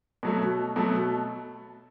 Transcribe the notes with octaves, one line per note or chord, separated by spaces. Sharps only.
B2 F#3 A3
B2 F#3 A3